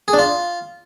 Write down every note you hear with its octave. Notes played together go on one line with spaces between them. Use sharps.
G#4
D4
F4